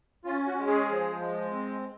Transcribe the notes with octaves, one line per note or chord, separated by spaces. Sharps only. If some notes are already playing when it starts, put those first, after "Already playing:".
C#4 F4
F#4
G#3
G#4
F3
G#3
C4